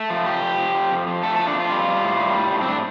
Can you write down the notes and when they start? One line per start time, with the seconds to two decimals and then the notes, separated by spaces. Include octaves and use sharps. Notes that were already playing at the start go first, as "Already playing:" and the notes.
Already playing: A3
0.10 F3
0.26 F2 G4
0.42 F3
0.59 F3
0.75 F3
0.91 F2
1.07 F3
1.23 A3 A4
1.36 F3 A4
1.47 D4
1.55 F2 F4
1.72 G3
1.88 G3
2.04 A2
2.20 G3
2.37 A2
2.53 A2
2.61 C4
2.68 A2 D4